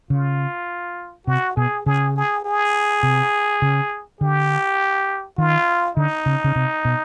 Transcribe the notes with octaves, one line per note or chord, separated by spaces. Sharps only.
C#3 F4
C3 F#4
B2 G#4
C#3 G#4
G#4
G#4
C3
C#3
D3 G4
D#3 F4
D3 D#4
C#3
C#3
C3
B2